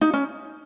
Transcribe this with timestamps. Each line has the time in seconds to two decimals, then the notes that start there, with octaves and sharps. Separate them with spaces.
0.01 D#4
0.14 C#4